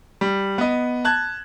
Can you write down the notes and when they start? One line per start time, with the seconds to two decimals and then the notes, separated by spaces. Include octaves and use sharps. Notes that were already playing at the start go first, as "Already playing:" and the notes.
0.21 G3
0.58 B3 D#5
1.05 A5 F#6 G#6